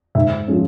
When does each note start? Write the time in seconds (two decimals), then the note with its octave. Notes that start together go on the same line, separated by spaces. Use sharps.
0.15 G#2 E5
0.48 F3 G#3 C#4